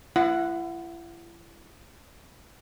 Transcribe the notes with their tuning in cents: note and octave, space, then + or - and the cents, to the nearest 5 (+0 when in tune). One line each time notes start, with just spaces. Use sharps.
E4 +40 F#5 +0